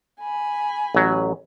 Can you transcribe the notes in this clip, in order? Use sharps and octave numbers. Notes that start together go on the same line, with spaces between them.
G#5 B5
A1 F#3